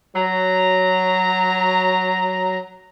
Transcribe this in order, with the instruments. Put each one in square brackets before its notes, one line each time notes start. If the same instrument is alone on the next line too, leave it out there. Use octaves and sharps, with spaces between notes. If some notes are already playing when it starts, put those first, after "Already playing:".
[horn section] F#3 A#5